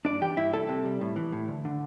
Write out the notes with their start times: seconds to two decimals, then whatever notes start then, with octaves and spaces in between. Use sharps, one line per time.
0.05 G2 D4 D5
0.21 E3 G4 G5
0.37 G2 E4 E5
0.53 C2 A4 A5
0.69 C3
0.85 G3
1.01 A2
1.16 E3
1.32 A2
1.48 D2
1.65 D3